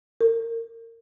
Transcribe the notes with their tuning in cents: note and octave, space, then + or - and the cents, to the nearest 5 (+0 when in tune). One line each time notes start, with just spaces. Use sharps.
A#4 -30